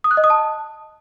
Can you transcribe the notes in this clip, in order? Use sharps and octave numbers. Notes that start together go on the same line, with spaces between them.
D#6
F#6
D#5
D#6
A5